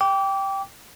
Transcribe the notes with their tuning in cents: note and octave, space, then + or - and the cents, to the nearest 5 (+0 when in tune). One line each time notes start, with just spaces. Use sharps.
G5 +0 D6 -25